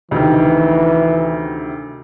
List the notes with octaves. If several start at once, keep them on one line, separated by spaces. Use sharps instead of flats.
D2 C3 D#3 E3